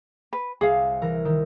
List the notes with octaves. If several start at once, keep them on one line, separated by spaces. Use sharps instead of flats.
B4
C2 G#4 F5
E3 A#4
D#3